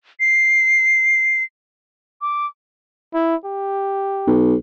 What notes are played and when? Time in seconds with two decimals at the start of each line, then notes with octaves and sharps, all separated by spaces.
0.20 C7
2.22 D6
3.14 E4
3.45 G4
4.27 B1